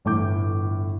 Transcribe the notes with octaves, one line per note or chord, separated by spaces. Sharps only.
G1 A2 E3 D6 G6